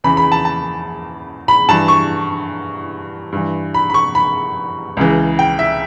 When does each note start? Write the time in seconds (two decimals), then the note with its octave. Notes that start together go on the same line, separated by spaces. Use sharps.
0.04 E2 C#3 E3 B5
0.17 B5
0.32 A5
0.45 A5
1.48 B5
1.68 G2 E3 A5
1.88 C#6
3.32 G2 E3
3.74 B5
3.90 B5
3.94 C#6
4.15 B5
4.97 C#2 C#3 E3
5.39 G5
5.59 E5